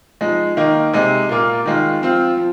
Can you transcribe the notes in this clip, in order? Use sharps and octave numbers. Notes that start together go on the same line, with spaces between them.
F3 G#3 D#4
D#3 A#3 D#4
C3 G#3 D#4
A#2 A#3 F4
D#3 G#3 F4
F3 C4 F4
F3